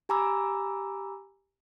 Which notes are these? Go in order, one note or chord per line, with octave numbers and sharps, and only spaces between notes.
G4 G#5 A#5 B5 D6 E6